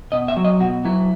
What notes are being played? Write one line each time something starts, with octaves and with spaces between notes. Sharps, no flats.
B2 D#5
E5
F#3
D#5
B2 F#4
F#3 E4